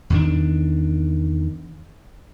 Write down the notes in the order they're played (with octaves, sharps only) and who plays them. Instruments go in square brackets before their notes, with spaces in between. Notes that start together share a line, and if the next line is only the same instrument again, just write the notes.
[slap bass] E2 D#3 D4